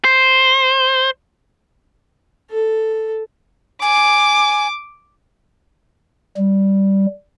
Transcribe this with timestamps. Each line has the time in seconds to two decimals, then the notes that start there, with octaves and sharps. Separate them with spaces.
0.05 C5
2.51 A4
3.82 G#5 D6
6.37 G3